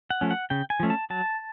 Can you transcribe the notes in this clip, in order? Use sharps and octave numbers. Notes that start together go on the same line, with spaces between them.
F#5
F3 A3 C#4
F#5
C#3 G5
G#5
F3 A3 C#4
A5
F#3 A5